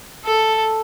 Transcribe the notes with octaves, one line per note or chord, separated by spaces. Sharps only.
A4